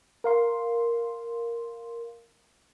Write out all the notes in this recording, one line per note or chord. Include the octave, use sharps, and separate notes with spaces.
A#4 F5 C6